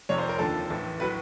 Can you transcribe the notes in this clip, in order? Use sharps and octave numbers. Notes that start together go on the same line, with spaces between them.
F1 F2 C3 C#5
C5
A#4
D#2 D3 F3 A4
A1 A2 E3
A2 F#3 B4